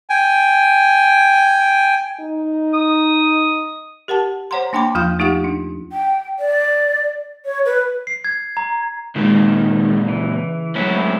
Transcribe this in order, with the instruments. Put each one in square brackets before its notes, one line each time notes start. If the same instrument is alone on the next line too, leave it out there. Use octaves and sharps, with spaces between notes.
[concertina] G5 G#5
[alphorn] D#4
[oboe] D#6
[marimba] G4 A#4 F#5 A5
C5 C#5 F#5 A#5 C6
A#3 D4 G5 B5 C6 D6
E2 F3 F4 F5 G6
A3 D#4 F4 G4 F5 F#5
D4
[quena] G5
D5
C#5
B4
[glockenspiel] C7
G#6
A#5
[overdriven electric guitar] C#2 A#2 [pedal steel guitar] D#3 [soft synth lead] G#3
[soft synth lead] C#3 [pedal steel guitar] E3
[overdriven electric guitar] A2 F#3 [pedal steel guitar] G#3 C#4 E4